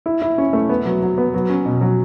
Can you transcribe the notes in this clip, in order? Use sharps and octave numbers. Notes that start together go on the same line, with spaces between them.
E4
E4
C#4
A3
B3
F#3
F#3
B3
F#3
C#4
B2
F#3